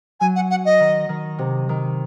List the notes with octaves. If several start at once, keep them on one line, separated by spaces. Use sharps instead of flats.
F#3 G#5
F#5
F#5
D#5
D#3
D#3
C3
D#3